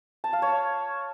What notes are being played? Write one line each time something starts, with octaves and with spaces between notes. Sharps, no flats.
A5
F5
C#5